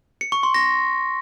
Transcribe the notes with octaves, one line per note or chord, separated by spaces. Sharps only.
C#7
C#6
C6
A#6